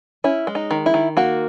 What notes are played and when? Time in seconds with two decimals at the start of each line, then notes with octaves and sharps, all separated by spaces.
0.24 C#4 E4
0.47 G#3
0.55 D#4
0.71 D#3
0.86 E4
0.94 D#3
1.17 A#3 F#4